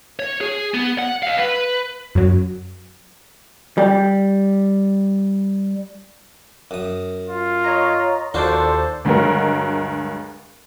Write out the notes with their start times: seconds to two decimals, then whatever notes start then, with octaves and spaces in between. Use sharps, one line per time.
0.19 C#5
0.41 G#4
0.74 B3
0.99 F#5
1.23 D#5 F5
1.38 B4
2.15 F#2 F#3
3.78 G3 G4
6.71 F#2 D#6
7.27 F4
7.64 C#5 D#5 A#5
8.34 D#2 D4 F4 F#4 A4 C5 D5
9.05 D2 G2 F#3 G#3 A#4